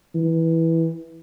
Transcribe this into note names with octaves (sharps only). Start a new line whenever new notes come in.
E3